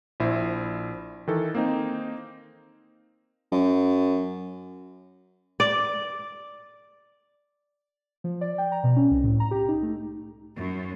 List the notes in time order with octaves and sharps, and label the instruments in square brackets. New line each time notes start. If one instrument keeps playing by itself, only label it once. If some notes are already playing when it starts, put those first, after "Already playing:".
[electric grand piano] A#1 E4 C5
D#3 E3 A4
A#3 C4 D#4
[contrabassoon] F#2
[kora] D5
[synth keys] F3
D5
G5
A#5
B2
C#4
C2
A2
A#5
G4
D#4
A3
[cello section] F#2